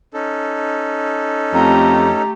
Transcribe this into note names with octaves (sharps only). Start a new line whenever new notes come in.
C#4 D#4 A4
F2 A3 G4 A#5